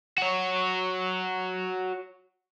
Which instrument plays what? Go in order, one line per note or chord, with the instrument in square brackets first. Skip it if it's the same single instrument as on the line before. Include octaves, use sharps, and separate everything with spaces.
[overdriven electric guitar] F#4 C#5